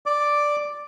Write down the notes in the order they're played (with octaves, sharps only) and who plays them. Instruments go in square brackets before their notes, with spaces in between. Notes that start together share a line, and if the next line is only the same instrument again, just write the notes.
[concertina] D5 D6